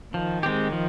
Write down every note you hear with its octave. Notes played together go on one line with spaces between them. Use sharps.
D#3 F3
G#3 C4 G4
F3